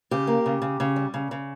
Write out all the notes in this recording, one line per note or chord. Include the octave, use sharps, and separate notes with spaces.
C#3 G4
A#3
C#3
C#3
C#3
G3
C#3
C#3